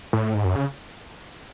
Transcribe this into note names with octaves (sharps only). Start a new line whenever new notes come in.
A2
G#2
F#2
C#3